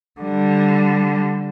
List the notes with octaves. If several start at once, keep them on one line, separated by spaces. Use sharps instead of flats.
D3 G3